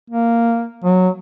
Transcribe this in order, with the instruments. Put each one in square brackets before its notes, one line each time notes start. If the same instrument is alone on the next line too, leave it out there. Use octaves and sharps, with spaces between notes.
[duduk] A#3
F#3